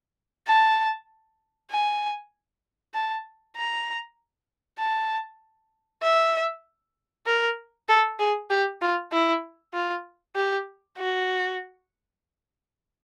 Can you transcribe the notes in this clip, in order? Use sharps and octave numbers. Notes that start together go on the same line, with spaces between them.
A5
G#5
A5
A#5
A5
E5
A#4
A4
G#4
G4
F4
E4
F4
G4
F#4